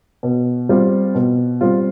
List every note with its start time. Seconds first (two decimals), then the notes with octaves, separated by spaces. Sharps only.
0.23 B2
0.69 G3 C4 F4
1.15 B2
1.61 G3 C4 F4